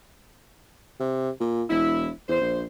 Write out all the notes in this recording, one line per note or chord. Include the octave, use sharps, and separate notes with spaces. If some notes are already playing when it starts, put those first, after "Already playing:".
C3
A#2
E1 E4
E2 C5
A#1